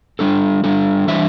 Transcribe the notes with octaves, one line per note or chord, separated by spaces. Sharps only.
G3 D4 A4
G3 D4 A4
E3 G3 D4 C5 E5